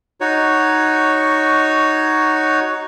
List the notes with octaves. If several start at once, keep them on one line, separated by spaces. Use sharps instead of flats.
D#4 F#4 C#5